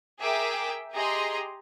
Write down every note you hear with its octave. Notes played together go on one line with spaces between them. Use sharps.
G#4 A#4 E5 G5 D6
G4 G#4 D#5 A#5 C6